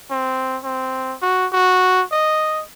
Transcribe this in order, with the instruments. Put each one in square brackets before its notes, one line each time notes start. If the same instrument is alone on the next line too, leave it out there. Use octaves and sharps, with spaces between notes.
[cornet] C4
C4
F#4
F#4
D#5